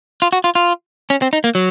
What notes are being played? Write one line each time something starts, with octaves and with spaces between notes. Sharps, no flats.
F4
F#4
F4
F4
C#4
C4
D#4
A#3
F#3